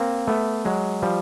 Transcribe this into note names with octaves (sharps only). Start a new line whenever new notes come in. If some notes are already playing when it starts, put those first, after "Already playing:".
Already playing: A#3 C4
A3 B3
F#3 G#3
F3 G3